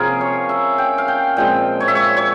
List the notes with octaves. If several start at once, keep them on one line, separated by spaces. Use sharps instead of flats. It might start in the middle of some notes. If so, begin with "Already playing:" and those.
Already playing: C3 F3 A#3 C#4 G#4 A#4
C#5
E5
G5
F5
G5
A#2 F3 G#3 C4 G5
C#5
E5
C#5
C#5